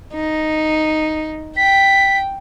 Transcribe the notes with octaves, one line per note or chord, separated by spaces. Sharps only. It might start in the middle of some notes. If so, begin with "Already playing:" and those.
D#4
G5 B6